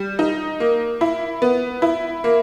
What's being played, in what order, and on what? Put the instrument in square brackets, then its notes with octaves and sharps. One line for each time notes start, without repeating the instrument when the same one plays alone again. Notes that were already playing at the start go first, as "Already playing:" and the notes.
Already playing: [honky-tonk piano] G3
D#4
A#3
E4
B3
E4
A#3